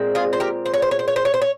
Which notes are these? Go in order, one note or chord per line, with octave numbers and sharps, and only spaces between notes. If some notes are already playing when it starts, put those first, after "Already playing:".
Already playing: A#2 G#3 C4
F4 G#4
C5
G4 A#4
C5
C#5
C5
C#5
C5
C#5
C5
C#5
C5
C#5